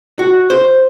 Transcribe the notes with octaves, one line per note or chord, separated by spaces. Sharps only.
F#4
C5